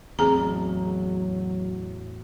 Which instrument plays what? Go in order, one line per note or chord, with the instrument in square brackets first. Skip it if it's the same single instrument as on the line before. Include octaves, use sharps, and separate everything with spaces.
[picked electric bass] A1 E2 [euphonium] F#3 [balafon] C4 G#4 A#5